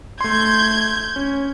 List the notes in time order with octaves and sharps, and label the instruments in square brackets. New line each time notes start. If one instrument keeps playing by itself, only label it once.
[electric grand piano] A3 C6 [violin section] G6 G#6
[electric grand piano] C#4